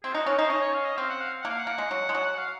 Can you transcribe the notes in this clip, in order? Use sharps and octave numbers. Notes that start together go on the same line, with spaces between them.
C4 G#4
F4
D#4 F#4
C#4 A#4
D#4 C5
C#4 D#5
C#5
F5
D#5
C4 F5
F#5
F5
A#3 F#5
F5
F#5
A#3
G#3
F#3
G#3
F#3
F5